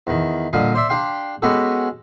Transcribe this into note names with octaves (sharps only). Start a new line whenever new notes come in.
E2 D#3
A#2 D3 G3 D#5 F5
C5 D5 E5
D4 G4 F5 G5 C6
G#3 B3 C#4 F#4 G4 A4